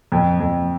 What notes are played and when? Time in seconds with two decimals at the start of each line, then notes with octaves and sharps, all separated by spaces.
0.12 F2
0.40 F2